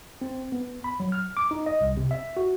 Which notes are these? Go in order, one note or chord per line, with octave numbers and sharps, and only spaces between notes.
C4
B3
B5
F#3
F6
D6
D#4
D#5
C2
C3
E5
F#4